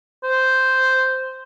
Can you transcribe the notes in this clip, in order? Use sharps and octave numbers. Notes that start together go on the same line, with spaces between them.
C5